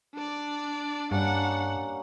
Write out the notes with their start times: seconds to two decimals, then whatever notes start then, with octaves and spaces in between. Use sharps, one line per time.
0.14 D4 D5
1.11 G2 G3 A#3 C#4 D4 F#5